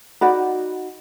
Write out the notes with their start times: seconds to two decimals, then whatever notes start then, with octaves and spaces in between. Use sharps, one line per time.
0.21 D#4 F#4 D5 B5